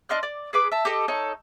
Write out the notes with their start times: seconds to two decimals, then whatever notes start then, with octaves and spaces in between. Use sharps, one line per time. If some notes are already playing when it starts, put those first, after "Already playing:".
0.09 D4 D#5 C6 F6
0.23 D5
0.53 G#4 B4 D6
0.72 E5 A5
0.85 G4 A4 D#5
1.08 D#4 A4 C#5